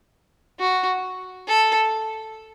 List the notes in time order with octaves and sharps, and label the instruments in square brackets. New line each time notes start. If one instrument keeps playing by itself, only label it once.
[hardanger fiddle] F#4
A4